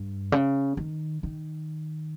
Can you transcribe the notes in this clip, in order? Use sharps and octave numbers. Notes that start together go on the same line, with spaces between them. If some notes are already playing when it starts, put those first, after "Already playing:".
Already playing: G2
C#3
D#3
D#3